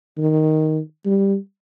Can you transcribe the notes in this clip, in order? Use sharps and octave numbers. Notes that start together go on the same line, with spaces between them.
D#3
G3